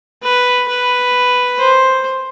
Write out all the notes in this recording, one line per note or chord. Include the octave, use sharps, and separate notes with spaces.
B4
B4
C5